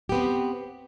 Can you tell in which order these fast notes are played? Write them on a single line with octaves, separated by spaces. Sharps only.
G4 B3 C4